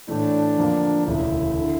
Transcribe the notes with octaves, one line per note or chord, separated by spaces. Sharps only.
A2 E3 A3 D4
F2 D3 F3 A#3
E1 D2 C#3 E4
D3